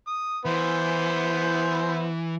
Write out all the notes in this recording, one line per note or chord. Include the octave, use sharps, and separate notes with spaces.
D#6
E3 B3 E4 C5